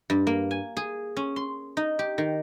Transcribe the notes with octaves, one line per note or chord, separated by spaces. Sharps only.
G2
A#3
G#5
G#4
C#4
C6
D#4
G4
D#3